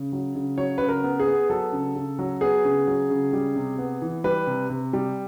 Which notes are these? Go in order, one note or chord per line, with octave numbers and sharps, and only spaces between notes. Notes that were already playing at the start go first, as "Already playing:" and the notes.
Already playing: C#3
F#3
C#3
F#3 C#5
C#3 B4
A#4
B3
G#4
B3
F#3 A4
C#3
C#3
F#3
B3 G#4
C#3
F#3
C#3
G3
C3
B3
E3
G3 B4
C3
C3
G3